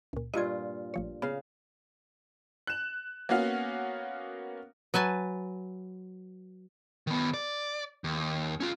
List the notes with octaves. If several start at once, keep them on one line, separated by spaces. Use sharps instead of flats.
C#2 A#2
G2 A#2 F4 D#5 G#6
A1 F3 C#5
C#3 B3 F5
F#6 E7
A#3 B3 C#4 F#4 F5
F#3 B4 G#5 A5
D#3 B3
D5
D#2
C#4 F4